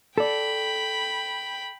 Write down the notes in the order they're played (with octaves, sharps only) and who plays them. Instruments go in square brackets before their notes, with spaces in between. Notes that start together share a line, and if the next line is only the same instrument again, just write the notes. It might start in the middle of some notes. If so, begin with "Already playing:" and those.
[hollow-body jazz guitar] A4 D5 [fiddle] G5 B5